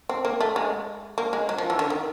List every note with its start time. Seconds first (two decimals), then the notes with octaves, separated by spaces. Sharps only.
0.09 C4
0.25 A#3
0.41 A3
0.56 G#3
1.18 A#3
1.33 G#3
1.49 F#3
1.58 F3
1.70 E3
1.79 D3
1.90 D#3